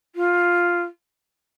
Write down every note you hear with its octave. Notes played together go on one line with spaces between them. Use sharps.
F4